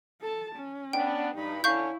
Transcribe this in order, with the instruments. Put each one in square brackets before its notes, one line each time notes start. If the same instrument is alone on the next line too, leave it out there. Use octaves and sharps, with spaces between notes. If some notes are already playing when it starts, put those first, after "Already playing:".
[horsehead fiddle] A4 A5
C#4
[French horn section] B3 D4 [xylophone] G5
[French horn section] G2 [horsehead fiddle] D#4 B5
[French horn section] D3 C#4 [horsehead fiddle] E4 [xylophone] F5 C#6 G6